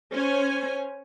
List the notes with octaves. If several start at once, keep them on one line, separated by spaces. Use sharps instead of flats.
C#4 C5 C#5 G#5